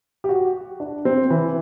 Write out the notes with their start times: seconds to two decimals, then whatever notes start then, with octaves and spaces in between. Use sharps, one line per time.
0.24 G4
0.29 F#4
0.80 D4
1.05 C4
1.30 E3